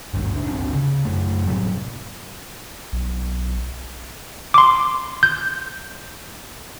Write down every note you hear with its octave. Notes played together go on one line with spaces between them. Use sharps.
G#1 D2 G2
C#2 D4
G#1 D2 C3 D4
C#3
F#2 A3
A2 C3 F#3 G3
B1
C6 D6
G6